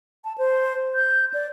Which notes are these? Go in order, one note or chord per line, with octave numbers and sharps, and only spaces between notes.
A5
C5
G6
D5